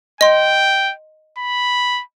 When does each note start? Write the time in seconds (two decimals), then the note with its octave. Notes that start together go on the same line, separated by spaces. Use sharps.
0.21 D#5 G5 C6
1.38 B5